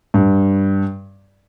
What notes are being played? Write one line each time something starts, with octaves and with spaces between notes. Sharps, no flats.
G2